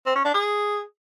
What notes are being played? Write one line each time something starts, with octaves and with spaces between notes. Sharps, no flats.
C4
C#4
D4
G#4